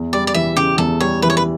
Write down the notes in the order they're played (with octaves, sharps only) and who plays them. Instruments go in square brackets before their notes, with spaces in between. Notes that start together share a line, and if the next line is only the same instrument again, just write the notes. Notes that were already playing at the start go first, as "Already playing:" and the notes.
Already playing: [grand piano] E2
[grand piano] G3 [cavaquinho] D5
[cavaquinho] D5
[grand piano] E3 [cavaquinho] E5
[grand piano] C#3 [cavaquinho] G4
[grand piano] E2 [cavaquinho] A4
[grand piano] G3 [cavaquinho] C#5
[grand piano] E3 [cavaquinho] B4
[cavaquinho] C#5
B4